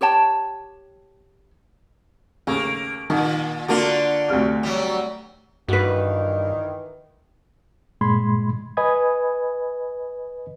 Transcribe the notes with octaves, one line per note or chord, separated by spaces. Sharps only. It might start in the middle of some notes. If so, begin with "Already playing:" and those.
G4 C#5 G5 A5
D#2 C#3 A3 A#3
A#2 D#3
D3 A#3 D4 F4 F#4
D2 C3 F6
F#3 G3
G2 D#3 E3 F#4 B4
G2 A#2 G#3 B5 C6 G#6
B4 D#5 G#5 B5 D#6 G#6